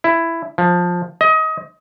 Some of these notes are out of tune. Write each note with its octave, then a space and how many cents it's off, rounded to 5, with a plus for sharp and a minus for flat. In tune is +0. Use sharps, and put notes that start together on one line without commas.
E4 +10
F3 +15
D#5 +25